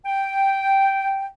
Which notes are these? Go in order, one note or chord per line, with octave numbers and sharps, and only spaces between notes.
G5